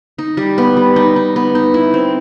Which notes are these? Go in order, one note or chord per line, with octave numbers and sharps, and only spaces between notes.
D#4
G3
B3
G3
D#4
D#4
B3
D#4
E4
C4